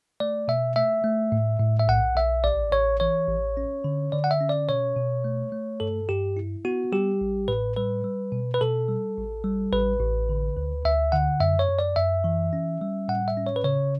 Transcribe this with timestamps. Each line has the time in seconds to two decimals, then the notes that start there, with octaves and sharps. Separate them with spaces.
0.20 A3 D5
0.48 B2 E5
0.76 A3 E5
1.04 A3
1.32 A2
1.60 A2
1.79 E5
1.88 B1 F#5
2.16 B1 E5
2.44 A1 D5
2.72 A1 C#5
3.00 E3 C#5
3.29 A1
3.57 C#4
3.84 D3
4.12 D3 D5
4.24 F#5
4.31 E5
4.40 C#4
4.49 D5
4.69 B2 C#5
4.96 B2
5.24 A3
5.52 A3
5.80 G2 A4
6.09 G2 G4
6.37 E4
6.65 B3 F#4
6.92 G3 G4
7.21 A1
7.48 A2 B4
7.76 G3 B4
8.04 G3
8.32 B2
8.54 B4
8.61 B2 A4
8.88 G3
9.17 A1
9.44 G3
9.73 A1 B4
10.00 A1
10.29 D3
10.57 D2
10.85 D2 E5
11.12 D3 F#5
11.40 F#2 E5
11.59 C#5
11.69 F#2
11.79 D5
11.96 F#2 E5
12.24 E3
12.53 C#4
12.81 G3
13.08 A2 F#5
13.28 E5
13.37 C#4
13.46 C#5
13.56 B4
13.64 C#3 C#5